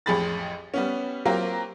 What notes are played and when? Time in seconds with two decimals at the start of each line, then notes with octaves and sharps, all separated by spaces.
0.06 A1 F2 G4 G#4 B5 A6
0.74 G3 B3 C#4
1.25 F#3 A#3 C4 F4 G4 A#4